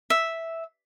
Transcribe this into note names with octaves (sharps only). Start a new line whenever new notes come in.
E5